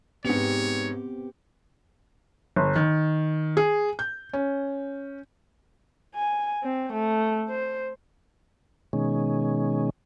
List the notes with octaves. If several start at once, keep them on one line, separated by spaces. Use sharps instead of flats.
G#2 B3 C4 G4 C#5 C#7 F7
G1
D#3
G#4
G6
C#4
G#5
C4
A3
C5
B2 D#3 G#3 C#4